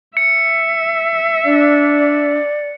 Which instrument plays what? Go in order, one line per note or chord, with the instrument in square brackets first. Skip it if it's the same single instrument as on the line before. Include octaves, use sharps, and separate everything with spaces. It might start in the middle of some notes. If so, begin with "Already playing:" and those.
[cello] E5 [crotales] C#7
[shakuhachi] D4 [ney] D5